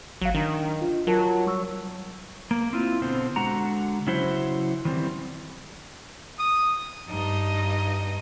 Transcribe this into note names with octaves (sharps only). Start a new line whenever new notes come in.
G#1 F#3 F5
D#3 D4 A#5
F4
F#3 F4 A#4 A5
G3 C#6 E6
A#3
C4 E4 F4
B2 D3 C4
D3 G#3 F#4 F#5 A#5
C#3 F#3 C#4 E4 F#4 C5
D#3 E3 G3 C4
D#6
G2 D#4 D#5